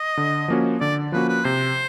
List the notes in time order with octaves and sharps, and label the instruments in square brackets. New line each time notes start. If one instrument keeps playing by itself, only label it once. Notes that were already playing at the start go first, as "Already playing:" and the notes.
Already playing: [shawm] D#5
[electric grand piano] D3
F3 A#3 C#4 F#4
[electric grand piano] D3 [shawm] D5
[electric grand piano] F3 A#3 C#4 F#4 [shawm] B4
[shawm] B4
[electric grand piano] C3 [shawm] C5